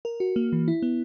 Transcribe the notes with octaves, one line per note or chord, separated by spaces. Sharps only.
A#4
F#4
A#3
E3
E4
B3